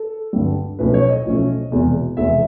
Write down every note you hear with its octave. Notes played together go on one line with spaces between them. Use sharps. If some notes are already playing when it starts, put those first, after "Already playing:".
Already playing: A4
G2 D3 G3
B1 A2 F3 A3 C#4 B4
C#5
D#5
B1 A2 F3 A3 C#4
F1 E2 B2 G#3
F1 E2 B2 G#3 E5